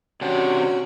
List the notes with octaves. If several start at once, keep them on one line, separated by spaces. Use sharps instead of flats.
C3 C#4 D4 F#4